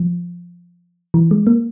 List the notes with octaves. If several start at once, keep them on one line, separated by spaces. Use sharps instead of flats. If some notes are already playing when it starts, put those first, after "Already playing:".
Already playing: F3
E3
G#3
A#3